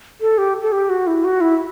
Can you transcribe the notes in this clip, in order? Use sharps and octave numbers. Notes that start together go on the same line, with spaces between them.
A4
G4
A4
G4
F#4
E4
F#4
E4